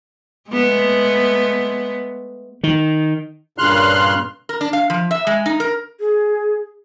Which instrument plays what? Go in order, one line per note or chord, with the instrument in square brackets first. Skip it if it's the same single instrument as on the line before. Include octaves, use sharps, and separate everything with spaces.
[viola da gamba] G#3 A3 B3
[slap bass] D#3
[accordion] G2 A#2 C#3 C6 F6 F#6
[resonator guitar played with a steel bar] A#4
D4
F5
F3
E5
G#3
D#4
A#4
[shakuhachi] G#4